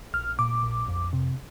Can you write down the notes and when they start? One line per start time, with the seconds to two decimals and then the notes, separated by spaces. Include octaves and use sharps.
0.14 A#1 F6
0.39 A#2 D6
0.63 A#1
0.88 F2
1.13 C3